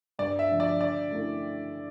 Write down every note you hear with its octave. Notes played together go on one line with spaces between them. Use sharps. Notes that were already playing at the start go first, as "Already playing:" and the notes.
G2 D5
E5
D3 F3
D5
D3 D5
A3 C#4 E4 A#4